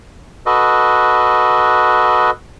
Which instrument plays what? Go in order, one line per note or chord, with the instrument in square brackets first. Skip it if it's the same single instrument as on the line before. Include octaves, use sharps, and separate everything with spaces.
[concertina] F#4 A4 B4 D#5